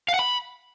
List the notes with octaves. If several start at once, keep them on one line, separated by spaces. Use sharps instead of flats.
F5
F#5
B5